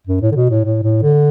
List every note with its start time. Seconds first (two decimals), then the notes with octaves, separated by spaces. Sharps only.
0.07 F#2
0.21 A2
0.31 D3
0.35 B2
0.50 A2
0.65 A2
0.83 A2
1.02 D3